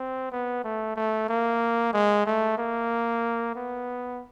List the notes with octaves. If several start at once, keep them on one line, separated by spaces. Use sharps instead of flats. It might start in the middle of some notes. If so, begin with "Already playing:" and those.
Already playing: C4
B3
A3
A3
A#3
G#3
A3
A#3
B3